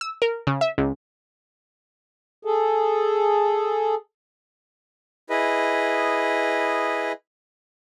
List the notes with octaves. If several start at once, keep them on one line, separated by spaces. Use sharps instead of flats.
E6
A#4
C#3
E5
C#2
G#4 A4
E4 G#4 B4 D#5